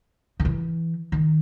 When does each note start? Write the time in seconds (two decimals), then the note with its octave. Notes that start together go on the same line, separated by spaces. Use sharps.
0.40 D#3
0.45 E3
1.12 D#3